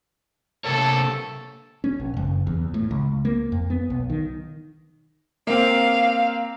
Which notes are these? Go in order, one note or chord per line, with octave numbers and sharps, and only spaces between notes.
C3 A#3 A4 C#5
C#4
A#1
F#1
E2
A2
C#2
A#3
F2
B3
B1
D#3
A#3 C4 F5